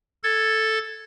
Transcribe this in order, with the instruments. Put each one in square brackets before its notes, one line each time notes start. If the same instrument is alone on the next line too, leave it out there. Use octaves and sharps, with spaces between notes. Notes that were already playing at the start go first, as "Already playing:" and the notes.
[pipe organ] A4 G#6 A6